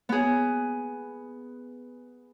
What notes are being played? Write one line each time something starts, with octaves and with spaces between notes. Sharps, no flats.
B3 G#4